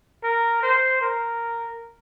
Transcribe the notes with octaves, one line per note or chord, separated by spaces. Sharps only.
A#4
C5
A#4